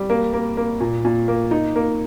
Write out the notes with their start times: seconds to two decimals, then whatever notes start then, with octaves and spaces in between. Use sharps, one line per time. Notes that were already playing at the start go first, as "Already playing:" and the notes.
Already playing: G3
0.10 A#3
0.33 A#3
0.57 A#3
0.80 A#2
1.05 A#2
1.28 A#3
1.51 D#4
1.76 A#3